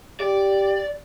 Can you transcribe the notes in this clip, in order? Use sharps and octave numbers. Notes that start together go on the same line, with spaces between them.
G4 D5